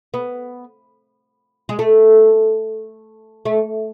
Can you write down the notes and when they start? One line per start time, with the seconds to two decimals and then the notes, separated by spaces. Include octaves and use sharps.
0.14 B3
1.69 G#3
1.79 A3
3.45 A3